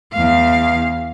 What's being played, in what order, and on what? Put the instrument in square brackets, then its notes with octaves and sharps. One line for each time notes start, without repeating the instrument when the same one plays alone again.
[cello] E2 F5